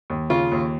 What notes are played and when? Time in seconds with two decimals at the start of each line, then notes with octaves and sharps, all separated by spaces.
0.10 D#2
0.30 C#3 F4
0.52 D#2